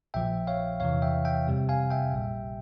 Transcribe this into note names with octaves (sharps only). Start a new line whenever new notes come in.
A#1 A#2 F3 E5 G5
C#5 F5
E2 C3 E3 C#5 F5
E5 G5
E5 G5
F2 C3 G3
F5 G#5
E5 G5
A#1 A#2 G3